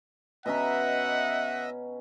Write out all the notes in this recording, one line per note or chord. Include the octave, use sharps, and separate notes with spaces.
B2 C#4 D#5 E5 F#5 A#5